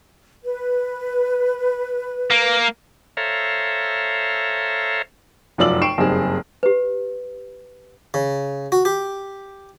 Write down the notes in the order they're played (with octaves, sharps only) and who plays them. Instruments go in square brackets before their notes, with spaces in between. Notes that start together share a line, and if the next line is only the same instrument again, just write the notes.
[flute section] B4
[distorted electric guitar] A#3
[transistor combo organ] A4 C5 C#5 E5 F5 A#5
[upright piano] F1 F#2 F4 D5 E6 F#7
G5 C#6 C7 D7 E7
F#1 G2 C4 D#4 G#4
[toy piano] G4 B4
[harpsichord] C#3
F#4
G4